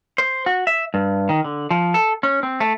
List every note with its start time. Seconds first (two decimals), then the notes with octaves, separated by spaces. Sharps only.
0.18 C5
0.46 F#4
0.67 E5
0.94 G2
1.29 D#3
1.44 D3
1.71 F3
1.94 A4
2.23 C#4
2.43 C4
2.60 A3